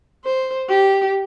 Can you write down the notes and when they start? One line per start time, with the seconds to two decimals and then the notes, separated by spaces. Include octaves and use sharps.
0.25 C5
0.69 G4